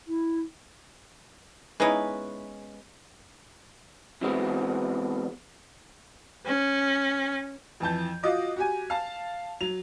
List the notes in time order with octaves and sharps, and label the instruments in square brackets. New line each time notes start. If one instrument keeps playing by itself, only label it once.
[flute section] E4
[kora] G#3 B3 C#4 [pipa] D#4 E4 B4
[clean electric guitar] C3 E3 F#3 G#3 B3 C4
[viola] C#4
[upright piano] F2 E3 A5 G6
F4 F#4 D#5 D6
F#4 G4 G#5
F5 A5
F#3 F7